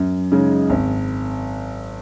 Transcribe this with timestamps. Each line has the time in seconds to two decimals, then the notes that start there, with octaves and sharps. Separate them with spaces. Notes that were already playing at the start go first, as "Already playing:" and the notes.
Already playing: F#2
0.31 C#3 G#3 D#4
0.69 G#1